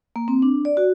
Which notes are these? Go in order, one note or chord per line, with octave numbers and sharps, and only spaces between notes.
A#3
C4
D4
D5
F#4